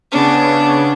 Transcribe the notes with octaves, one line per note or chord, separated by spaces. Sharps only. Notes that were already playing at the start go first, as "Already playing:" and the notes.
C#3 B3 C#4 D4